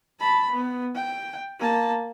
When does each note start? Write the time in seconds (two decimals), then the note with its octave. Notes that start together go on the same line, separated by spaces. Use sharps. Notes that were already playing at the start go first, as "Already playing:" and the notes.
0.20 A5 B5
0.51 B3
0.95 G5
1.59 A#3 A5